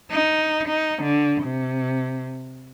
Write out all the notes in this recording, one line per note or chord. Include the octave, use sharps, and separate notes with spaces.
D#4
D#4
D3
C3